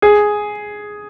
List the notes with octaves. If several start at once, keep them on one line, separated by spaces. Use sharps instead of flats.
G#4